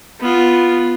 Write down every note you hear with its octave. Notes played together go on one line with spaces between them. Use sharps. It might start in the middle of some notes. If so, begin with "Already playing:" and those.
B3 F4